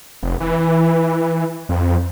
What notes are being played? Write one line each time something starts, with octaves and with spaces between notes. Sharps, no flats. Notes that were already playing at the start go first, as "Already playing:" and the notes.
F1
E3
F2